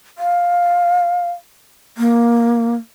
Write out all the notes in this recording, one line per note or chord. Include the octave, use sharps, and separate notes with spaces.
F5
A#3